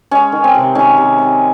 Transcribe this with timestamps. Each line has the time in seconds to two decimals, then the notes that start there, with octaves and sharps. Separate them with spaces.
0.11 G#3 C#4
0.32 D#3
0.44 C4
0.55 C3
0.75 D#3 C#4
0.97 C3
1.18 C3